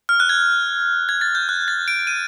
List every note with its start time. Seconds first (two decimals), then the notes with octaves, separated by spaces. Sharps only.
0.09 F6
0.20 F#6
0.29 G#6
1.09 G#6
1.21 A6
1.35 G6
1.49 F#6
1.68 A6
1.88 D7
2.07 D#7